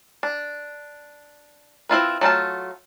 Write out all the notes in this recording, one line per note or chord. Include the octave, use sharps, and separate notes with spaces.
D4
C4 E4 F4 B4
F#3 A3 F4 A5